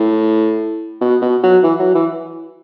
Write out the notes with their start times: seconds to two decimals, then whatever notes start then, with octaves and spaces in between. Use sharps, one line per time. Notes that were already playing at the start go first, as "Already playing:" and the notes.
Already playing: A2
1.01 B2
1.22 B2
1.44 F#3
1.63 E3
1.80 F#3
1.95 E3